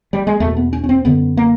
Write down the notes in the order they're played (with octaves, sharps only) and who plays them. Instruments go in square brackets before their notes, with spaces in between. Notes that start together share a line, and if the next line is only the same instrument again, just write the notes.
[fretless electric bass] G3
G#3
E2 B2 A3
B3
C#4
C#4
C4
F#2 D3 B3
A#3